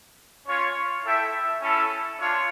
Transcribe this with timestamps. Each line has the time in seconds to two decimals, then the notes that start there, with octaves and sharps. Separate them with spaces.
0.47 C#4 F4 C#5
1.04 E4 A4 E5 G5
1.62 C#4 E4 A4
2.20 D4 F4 C#5